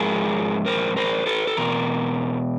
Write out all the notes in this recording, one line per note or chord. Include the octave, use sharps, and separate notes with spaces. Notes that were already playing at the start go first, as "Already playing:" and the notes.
Already playing: G#2 F3 G#3 G#4 A#4
A#4 C5
A#4 C5
A4 B4
A4
E2 B2 A#4